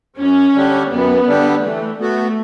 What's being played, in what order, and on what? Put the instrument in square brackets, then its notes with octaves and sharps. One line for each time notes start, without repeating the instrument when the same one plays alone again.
[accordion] F#2 [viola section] C#4
[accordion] D3 G3 D4 G4
[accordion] F#2 [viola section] B3
[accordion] D3 G3 D4 G4
[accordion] E3 [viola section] A3
[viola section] A3 [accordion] B3 F#4